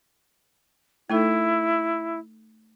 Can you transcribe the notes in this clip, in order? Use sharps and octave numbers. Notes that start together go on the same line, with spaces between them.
A3 D#4 E4 A4